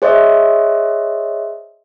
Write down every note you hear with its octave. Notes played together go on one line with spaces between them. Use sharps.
G#4 C5 C#5 D#5 E5